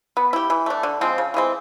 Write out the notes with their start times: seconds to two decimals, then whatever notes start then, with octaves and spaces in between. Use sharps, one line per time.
0.17 B3
0.33 E4 G4
0.50 E3
0.66 A3 D4
0.83 D3
1.01 F3 G#3 C4
1.18 C#3
1.34 E3 G#3 C4